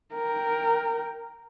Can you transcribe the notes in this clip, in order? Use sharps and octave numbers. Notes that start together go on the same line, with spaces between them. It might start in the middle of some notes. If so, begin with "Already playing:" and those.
A#4 G5